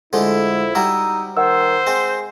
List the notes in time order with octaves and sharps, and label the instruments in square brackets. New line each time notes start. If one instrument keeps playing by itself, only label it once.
[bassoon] F2 [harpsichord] D3 G#3 A3 [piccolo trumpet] E4
[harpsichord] G3 F#4 [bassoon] D#4 [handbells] E6
[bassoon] D#3 [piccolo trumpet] C5 [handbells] F#5 E6
[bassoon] G#3 [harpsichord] C4